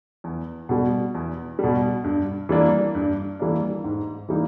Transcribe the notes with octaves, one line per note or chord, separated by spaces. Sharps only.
E2
B2 G3
E2
B2 G3
G2
E3 G3 A#3 D4
G2
E3 G3 A#3 D4
G#2
E3 G3 A#3 D#4